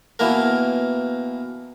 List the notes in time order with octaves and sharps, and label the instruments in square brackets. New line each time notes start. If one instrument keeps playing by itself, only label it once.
[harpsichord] B2 E3 A#3 A#4